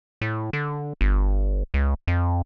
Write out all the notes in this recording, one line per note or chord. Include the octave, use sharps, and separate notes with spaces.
A2
D3
G1
C#2
F2